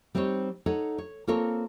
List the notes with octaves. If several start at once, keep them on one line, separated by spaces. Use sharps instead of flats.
G3 C4 D#4 C5 C#5
D#4 A4 C#5 F#5
C#5
A#3 C4 F4 A4 A#4 C#5